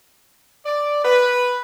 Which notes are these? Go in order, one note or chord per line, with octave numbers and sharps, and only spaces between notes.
D5
B4